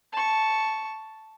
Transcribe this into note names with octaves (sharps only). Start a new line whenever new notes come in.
A5 C#6